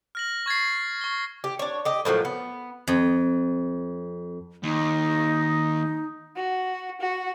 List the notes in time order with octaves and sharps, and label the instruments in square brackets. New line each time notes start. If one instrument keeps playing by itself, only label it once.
[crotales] F6 A#6 F#7
C#6 G#6 A6 C7
C#6 G7
[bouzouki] G4
D4 C#5
G4 D#5
A2 F3 F#3 A#3
B3
[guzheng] F2
[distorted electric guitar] D#2 [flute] D#4
[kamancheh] F#4
F#4